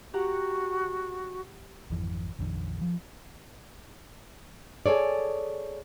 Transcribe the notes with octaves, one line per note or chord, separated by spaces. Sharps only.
F#4 G4 F#5 A#5
G#1 F2 E3
A#1 F2 D#3 D4
F3
G#4 A4 C#5 D5